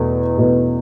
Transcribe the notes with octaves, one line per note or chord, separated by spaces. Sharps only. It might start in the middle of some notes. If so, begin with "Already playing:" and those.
Already playing: E2 B2 A3
E2 B2 A3